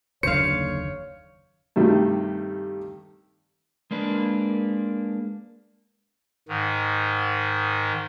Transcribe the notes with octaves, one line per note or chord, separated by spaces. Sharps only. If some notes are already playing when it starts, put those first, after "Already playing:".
F#1 D#2 D3 C5 C#5 F5 C#7
G2 C3 D#3 G3 A3
G#3 A#3 D4 B4
G#2 D#3